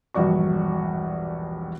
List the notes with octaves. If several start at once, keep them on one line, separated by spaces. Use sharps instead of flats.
E1 A#1 G2 F#4 D5 C#6